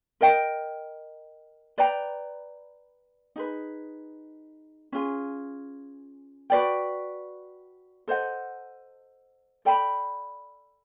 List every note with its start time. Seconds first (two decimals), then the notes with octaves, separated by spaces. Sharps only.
0.21 A#4 D#5 G5
1.78 B4 D5 G5 A#5
3.36 D#4 G#4 B4
4.92 C#4 F4 G#4
6.50 F#4 B4 D5 G5
8.08 A4 C5 D#5 F#5
9.65 A4 D5 G5 B5